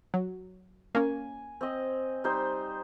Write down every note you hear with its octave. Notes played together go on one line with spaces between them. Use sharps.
F#3
A#3 C#4 G#5
C4 D#5
G3 D#4 C5